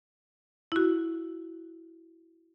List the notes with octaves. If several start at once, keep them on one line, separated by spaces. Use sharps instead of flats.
E4 F#4